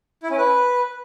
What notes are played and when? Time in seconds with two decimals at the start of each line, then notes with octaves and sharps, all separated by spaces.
0.23 E4
0.30 C#4
0.38 B4